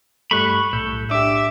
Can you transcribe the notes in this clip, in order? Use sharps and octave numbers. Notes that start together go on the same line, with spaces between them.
G2 G3 A3 B5 C#6 F#6
B1 A2 A4 G6
D4 G4 E5 D6